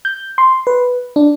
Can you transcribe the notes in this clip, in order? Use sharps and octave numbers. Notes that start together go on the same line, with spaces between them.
G6
C6
B4
D4